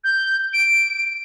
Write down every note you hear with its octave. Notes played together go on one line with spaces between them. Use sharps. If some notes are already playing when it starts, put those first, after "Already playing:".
G6
D7